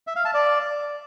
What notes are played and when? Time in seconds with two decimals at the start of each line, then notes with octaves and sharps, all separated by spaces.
0.07 E5
0.16 F5
0.25 A5
0.34 D5